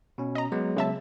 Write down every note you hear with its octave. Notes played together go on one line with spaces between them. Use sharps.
B2 C#4
D#5 A#5
F#3 G#3 B3
C#3 E5 A5